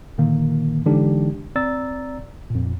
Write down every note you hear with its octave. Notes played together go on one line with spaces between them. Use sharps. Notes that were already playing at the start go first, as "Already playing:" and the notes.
A#2 D3 D#3 A#3
D3 E3 G#3 D4 D#4 G4
C4 D5 A#5 E6 A6
F2 A#2